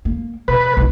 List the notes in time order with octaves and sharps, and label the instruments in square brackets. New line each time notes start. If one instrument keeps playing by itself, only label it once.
[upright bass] A#3
[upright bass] B2 [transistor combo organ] B4
[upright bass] B1 E4